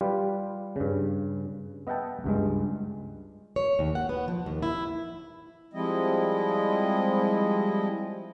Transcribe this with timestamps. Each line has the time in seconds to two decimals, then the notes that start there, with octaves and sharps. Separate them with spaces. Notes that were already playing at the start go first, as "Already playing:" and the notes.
0.01 G3 F4 G4 B4
0.76 G2 C#3
1.87 B3 D#5 E5 F#5 G5 A5
2.24 C#2 G2 G#3
3.56 C#5
3.79 D#2
3.95 F#5
4.09 B3
4.28 F3
4.46 D#2
4.62 E4
5.73 F3 G3 G#3 C4 E4 D#5